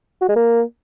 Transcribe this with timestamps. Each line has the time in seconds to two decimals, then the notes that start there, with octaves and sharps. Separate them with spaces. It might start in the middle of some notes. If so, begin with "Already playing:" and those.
0.21 F#4
0.29 G#3
0.36 A#3